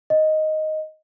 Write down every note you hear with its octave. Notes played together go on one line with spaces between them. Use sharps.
D#5